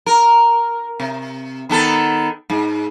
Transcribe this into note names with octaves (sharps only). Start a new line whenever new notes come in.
A#4
C3
D#3 B3 A4
G#2